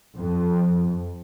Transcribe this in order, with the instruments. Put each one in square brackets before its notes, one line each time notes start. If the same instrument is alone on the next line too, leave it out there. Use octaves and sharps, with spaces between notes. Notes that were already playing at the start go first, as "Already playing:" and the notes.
[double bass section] F2